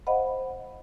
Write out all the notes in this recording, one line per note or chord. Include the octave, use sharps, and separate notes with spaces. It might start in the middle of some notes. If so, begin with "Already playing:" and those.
C5 D#5 F5 F#5 B5